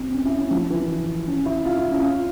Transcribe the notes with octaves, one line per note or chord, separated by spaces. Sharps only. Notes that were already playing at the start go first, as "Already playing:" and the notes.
Already playing: C4
C#4
E4
C#4
F3
E3
C#4
E4
F4
E4
C#4
F4